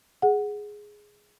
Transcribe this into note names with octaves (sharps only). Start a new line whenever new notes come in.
G#4 F#5